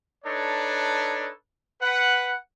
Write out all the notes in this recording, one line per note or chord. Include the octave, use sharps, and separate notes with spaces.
D4 D#4 A4 B4 C#5
B4 F#5